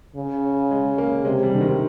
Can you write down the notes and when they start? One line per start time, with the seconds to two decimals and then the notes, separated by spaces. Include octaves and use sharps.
0.16 C#3
0.71 G#3
0.98 A#3
1.25 C3 G#3
1.43 G3
1.54 D3
1.61 D#3